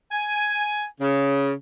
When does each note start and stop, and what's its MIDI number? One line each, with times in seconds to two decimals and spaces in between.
0.11 0.84 80
1.00 1.52 49